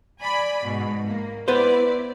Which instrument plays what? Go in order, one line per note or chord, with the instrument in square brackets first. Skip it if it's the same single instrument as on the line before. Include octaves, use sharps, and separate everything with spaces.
[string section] D5 G#5 B5
G#2 B2
A#3
[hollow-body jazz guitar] B3 B4 C5 [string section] E4 D5